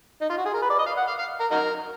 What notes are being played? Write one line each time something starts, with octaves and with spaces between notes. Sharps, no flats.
D#4
F4
F#4
G#4
A#4
B4
D5
D#5
F5
F#5
F5
F5
A#4
D#4 F#4 A#4